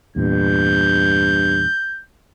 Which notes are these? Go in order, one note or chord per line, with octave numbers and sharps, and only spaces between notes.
E2 G2 A#2 G6